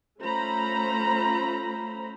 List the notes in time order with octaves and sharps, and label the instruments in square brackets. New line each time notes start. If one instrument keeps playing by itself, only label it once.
[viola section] A3 C#4 F4 C5 A#5 B5